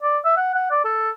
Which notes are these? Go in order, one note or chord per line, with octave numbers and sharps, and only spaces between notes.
D5
E5
F#5
F#5
D5
A4